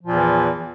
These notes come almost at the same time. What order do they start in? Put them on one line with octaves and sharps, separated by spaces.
F3 A#2 E2 E3